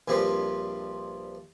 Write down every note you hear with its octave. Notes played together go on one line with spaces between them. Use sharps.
A#1 G2 F3 C4 G4